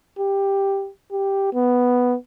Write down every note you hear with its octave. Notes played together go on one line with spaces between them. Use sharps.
G4
G4
B3